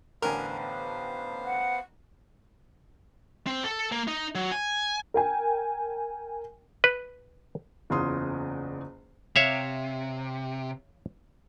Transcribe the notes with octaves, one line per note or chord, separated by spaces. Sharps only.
A1 D3 B3 A#4 C5 F5 G#5
F#5
C4
A4
A#3
D#4
F#3
G#5
A#4 G5 G#5
B4
F#1 E2 C#4 F4 C6 D#6
C3 C#5 E5 F5